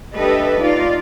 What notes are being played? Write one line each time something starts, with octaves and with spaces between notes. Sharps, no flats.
D4 G4 A4 B4 D#5 E5
D#4 F4 D5 F5